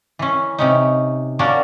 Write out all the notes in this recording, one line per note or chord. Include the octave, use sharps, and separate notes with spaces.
E3 C#4
C3 C#4 D#4
A#3 C#4 D4 F#4 A#4